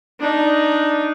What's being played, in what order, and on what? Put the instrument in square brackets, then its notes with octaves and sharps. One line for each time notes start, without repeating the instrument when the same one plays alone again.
[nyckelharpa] D4 D#4